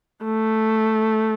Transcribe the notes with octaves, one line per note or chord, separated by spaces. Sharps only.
A3